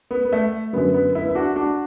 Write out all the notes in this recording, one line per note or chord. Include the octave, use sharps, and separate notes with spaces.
B3
B3
A3
F#2 D3 F#3 B3
B3
B3 E4
E4
D4 F#4
D4 F#4